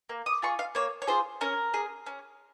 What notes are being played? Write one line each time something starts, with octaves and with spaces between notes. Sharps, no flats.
A#3
D#6
F4 G#4 C#6
F5
A#3 C#5
C#5
F4 G#4 C5
C#4 A#4
G#4
C#4